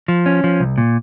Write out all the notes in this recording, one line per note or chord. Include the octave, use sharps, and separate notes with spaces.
F3
C#4
F3
C2
A#2